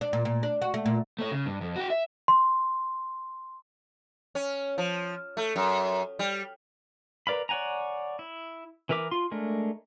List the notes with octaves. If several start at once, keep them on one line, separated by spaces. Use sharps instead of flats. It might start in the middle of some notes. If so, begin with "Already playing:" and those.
D4
A#2
A#2
D4
F#4
A3
A#2
A3 C#5
C#3
G2
F2
F#4 G5
E5
C6
C#4
F3
A3
F#2
G3
A#4 B4 D5 F5 B5
C#5 D5 F#5 G#5 A#5
E4
E3 E4 A#4 E5 D6
F4 C6
G#3 A3 D4 A#4